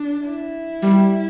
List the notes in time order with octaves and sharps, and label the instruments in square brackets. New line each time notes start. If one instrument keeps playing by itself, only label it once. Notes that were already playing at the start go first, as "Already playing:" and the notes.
Already playing: [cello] D4
E4
[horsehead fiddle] G3